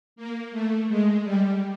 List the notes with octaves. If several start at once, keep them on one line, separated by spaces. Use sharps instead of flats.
A#3
A3
G#3
G3